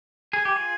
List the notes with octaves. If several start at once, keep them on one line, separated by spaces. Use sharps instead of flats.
G#4 G#5
G4
F4 G#4